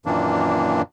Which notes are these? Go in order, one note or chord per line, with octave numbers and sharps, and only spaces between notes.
F#2 A#2 D#3 E3 A#3 D4